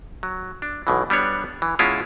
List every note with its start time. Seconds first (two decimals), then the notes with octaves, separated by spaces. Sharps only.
0.23 F#3
0.62 D4
0.87 B1 B2 E3
1.10 G3 B3 D4 C#5
1.62 E3
1.79 B2 G#3 C#4 E4 F4